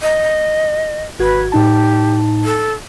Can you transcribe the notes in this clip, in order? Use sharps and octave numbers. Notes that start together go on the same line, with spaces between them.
D#5
G#1 F#4 B4 G#6
A2 D#4 G4 A5
A4